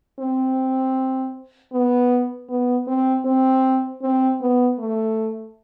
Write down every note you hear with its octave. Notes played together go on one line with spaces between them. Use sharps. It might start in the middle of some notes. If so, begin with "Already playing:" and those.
C4
B3
B3
C4
C4
C4
B3
A3